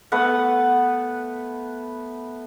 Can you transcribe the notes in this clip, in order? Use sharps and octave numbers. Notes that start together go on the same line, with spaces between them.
A3 B3 B4 F#5